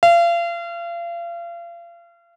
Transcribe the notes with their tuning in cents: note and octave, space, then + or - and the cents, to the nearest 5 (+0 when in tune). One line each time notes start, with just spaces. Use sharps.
F5 -35